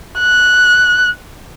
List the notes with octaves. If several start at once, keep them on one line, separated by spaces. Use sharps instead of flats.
F#6